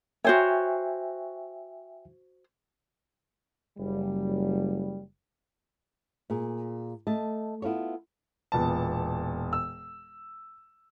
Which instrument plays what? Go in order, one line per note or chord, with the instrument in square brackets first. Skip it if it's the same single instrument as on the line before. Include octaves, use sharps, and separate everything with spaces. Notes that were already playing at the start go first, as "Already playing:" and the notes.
[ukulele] F#4 C5 C#5 [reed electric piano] E5 G5 G#5
[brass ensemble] F#1 G3
[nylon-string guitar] A#2 G#4
A3 D#5 A5
B3 E4 F4 A4 C#5
[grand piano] E1 A#2 B3 A5
E6